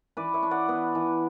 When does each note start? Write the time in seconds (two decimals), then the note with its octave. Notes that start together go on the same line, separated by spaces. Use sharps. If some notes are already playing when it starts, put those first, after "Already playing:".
0.17 E3 B4 D5
0.34 C#5 E5
0.43 D4
0.51 D5 F#5
0.69 B3
0.95 E3